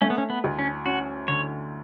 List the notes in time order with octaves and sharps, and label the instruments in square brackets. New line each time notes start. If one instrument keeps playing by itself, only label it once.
[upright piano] A3 [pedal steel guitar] C#4
[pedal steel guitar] B3
C#4
B3
[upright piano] D2
[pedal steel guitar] C#4
[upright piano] C#4 [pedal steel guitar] F#4
[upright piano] D3 [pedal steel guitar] C#5